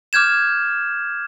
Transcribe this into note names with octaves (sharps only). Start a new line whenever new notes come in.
D6 F6 G6 G#6 E7